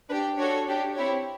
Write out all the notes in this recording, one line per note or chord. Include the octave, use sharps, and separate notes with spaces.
D4 G4 B4
D4 F#4 A4 C#5
D4 G4
C4 E4 G4 C#5